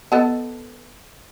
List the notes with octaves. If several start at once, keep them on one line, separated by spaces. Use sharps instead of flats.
B3 A4 D#5